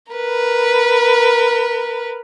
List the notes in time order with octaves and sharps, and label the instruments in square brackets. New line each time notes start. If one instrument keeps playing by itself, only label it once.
[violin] A#4 B4